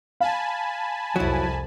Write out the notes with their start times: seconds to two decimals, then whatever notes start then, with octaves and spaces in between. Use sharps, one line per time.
0.20 F5 G#5 A5 B5
1.16 C2 F2 F#3 E4